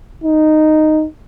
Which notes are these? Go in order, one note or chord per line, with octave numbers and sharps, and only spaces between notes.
D#4